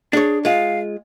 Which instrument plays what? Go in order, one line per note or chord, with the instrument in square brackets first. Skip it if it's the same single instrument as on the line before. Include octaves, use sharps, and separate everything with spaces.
[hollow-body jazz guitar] D4 C#5 [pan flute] G#4
[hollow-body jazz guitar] G#3 F4 [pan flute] F5